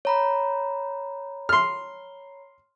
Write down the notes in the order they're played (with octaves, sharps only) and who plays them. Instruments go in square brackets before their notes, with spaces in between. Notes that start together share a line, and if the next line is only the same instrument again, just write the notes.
[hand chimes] C#5 A#5 B5
[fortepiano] C6 F6